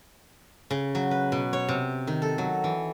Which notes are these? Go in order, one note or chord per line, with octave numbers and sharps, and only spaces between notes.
C#3
F#3
B4
B2
C#5
C3
D#3
A4
F#3
E3